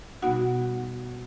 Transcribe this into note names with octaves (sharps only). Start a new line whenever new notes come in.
B2 G3 B3 D#4 F#4 F#5